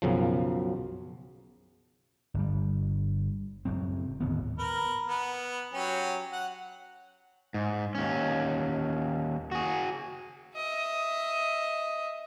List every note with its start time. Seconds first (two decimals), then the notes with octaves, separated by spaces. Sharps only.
0.02 B1 F#2 C#3 F3
2.34 G1 G3
3.65 F#1 A2 F#3 C4
4.20 D1 D#2 G#2 B3
4.59 A#4 B4
5.07 B3
5.74 F#3 C#4 G4
6.32 F#5
7.54 G#2
7.95 D#2 C#4
9.52 F#4 G#4
10.56 D#5 E5